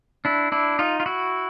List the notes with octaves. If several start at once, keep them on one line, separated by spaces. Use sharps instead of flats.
D4 E4
D4 E4
D#4 F4
F4
E4 F#4